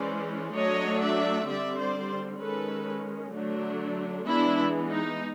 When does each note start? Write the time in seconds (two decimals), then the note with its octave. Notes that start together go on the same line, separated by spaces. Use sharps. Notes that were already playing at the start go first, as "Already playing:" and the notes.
Already playing: E3 G#3 C#4 C5 D5
0.55 F#3 A3 D4 C#5 D#5
1.01 D5 E5
1.48 D3 G3 C4 D5 E5
1.79 C5 D5
2.41 D#3 G#3 C#4 A4 B4
3.34 D3 F#3 A3 D4
4.28 E3 G#3 B3 D4 E4
4.90 D#4